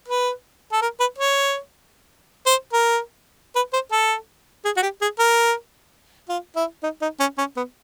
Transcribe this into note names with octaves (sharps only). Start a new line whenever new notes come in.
B4
A4
A#4
B4
C#5
C5
A#4
B4
C5
A4
G#4
F#4
G4
G#4
A#4
F4
E4
D#4
D#4
C#4
C#4
B3